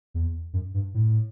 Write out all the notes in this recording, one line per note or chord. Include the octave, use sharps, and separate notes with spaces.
E2
F#2
G2
A2